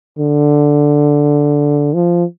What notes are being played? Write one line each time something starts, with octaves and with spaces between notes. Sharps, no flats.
D3
F3